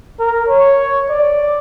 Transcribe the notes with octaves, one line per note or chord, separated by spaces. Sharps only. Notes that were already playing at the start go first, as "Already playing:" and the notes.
A#4
C#5
D5